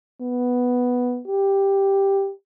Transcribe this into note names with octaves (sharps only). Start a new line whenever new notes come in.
B3
G4